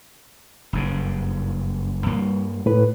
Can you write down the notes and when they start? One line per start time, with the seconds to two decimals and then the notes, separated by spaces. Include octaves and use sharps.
0.73 F#1 G2 C#3
2.06 G2 G3 A#3
2.66 A2 B4